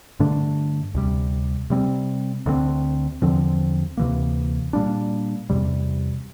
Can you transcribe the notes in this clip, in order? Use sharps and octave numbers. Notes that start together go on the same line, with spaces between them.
G2 D3 A3 D4
D2 C3 G3
C3 G3 C4
D2 D3 A3 C4
E2 D3 F3 C4
D2 C3 E3 A#3
A#2 G3 A#3 D4
E2 C3 G3